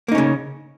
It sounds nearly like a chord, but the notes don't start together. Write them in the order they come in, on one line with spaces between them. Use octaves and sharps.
A#3 D#4 C#4 C#3